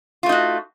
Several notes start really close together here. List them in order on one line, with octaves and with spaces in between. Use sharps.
F4 A3 D#4 F#4